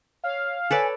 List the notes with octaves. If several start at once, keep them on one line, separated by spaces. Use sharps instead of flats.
C#5 F5
A4 B4 C#5 D5 G#5